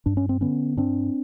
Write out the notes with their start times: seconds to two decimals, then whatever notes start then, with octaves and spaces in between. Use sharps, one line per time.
0.06 G2 D4
0.17 C#4
0.29 C4
0.41 D3 B3 C#4
0.77 G2 C4 D4